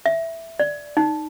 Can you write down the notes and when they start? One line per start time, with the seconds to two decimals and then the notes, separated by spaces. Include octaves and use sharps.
0.06 E5
0.60 D5
0.97 D#4